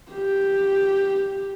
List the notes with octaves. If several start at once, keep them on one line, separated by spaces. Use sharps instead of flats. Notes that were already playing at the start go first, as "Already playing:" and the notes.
G4